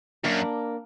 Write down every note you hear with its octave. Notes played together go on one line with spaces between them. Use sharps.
F#2 A#3 D4 A#4